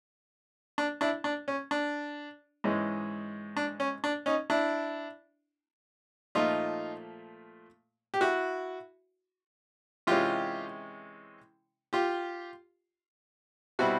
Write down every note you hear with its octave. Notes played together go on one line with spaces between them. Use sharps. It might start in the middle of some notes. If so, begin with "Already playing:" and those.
D4
D4 E4
D4
C#4
D4
G#2 E3 G#3 C#4
D4
C#4
D4
C#4 D#4
D4 E4
A#2 F3 A3 D#4 F4
G4
E4 F#4
C3 E3 G#3 C#4 F4 G4
F4 G4
B2 G3 C4 E4 F#4